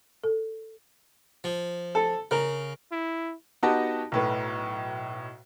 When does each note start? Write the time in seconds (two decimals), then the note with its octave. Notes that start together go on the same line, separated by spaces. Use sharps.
0.24 A4
1.44 F3
1.95 A4
2.31 C#3 A#4
2.92 E4
3.63 B3 D#4 F#4 G4 D#5 A5
4.12 B1 A2 B4